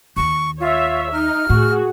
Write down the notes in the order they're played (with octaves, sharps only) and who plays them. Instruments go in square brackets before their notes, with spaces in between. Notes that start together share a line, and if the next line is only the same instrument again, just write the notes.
[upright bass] D#2 D#3 [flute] C#6
[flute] F4 [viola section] C#5 E5
[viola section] D#4 [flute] F6
[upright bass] A2 [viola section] F#4 G#4